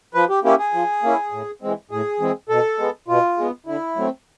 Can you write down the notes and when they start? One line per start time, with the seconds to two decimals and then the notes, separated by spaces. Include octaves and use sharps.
0.14 F3 B4
0.29 G4
0.44 A#3 C#4 E4 G4
0.59 G#4
0.73 F3
1.03 A#3 C#4 E4
1.32 A2
1.62 E3 G#3 C4
1.91 A2 G#4
2.20 E3 G#3 C4
2.49 B2 A4
2.78 G#3 B3
3.08 B2 F4
3.37 G#3 B3
3.66 D3 E4
3.96 F#3 A3 C4